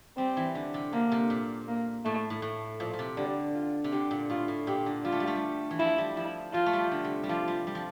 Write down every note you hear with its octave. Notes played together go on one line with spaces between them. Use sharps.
G3 C4
E3
D3
C3
D3 A#3
C3
A#2
A#3
A2 A3
A2
A2
A#2 F3
A#2
C3
D3 G3
F4
C3
D3 G4
A#2
A2 F4
A2
A#2 G4
D3
G3 F4
A3
G3
A3
G3
E3
F3 E4
G3
F3 E4
F3 F4
A3
G3
D3
C3
G3
F3 F4
G3
G3
F3